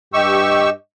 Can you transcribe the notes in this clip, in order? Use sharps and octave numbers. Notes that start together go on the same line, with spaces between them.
G2 G4 D#5 C#6 E6